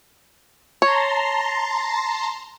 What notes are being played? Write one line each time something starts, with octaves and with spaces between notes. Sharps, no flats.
C#5 A5 A#5 C6